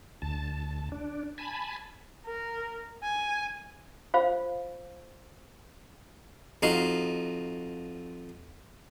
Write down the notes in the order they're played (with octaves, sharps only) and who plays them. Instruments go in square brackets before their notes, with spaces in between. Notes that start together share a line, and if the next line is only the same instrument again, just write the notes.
[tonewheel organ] D2 A5
D4
G#5 A5 B5
[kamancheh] A#4
G#5
[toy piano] F4 C5 F5
[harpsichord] F2 D#4 F#4 F5